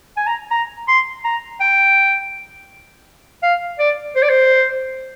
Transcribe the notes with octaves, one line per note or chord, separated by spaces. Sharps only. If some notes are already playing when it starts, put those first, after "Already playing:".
G#5
A#5
A#5
C6
A#5
G5
F5
D5
C5
D5
C5